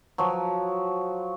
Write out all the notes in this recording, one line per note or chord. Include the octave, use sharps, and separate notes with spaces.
F3 F#3